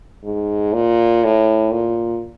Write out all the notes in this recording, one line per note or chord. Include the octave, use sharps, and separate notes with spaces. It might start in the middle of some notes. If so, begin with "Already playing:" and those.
G#2
A#2
A2
A#2